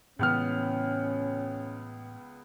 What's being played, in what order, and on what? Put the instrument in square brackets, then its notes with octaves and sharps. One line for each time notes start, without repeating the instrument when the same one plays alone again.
[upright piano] C#2 B3 F6 [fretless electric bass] A2 C#3 E3 [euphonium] C#4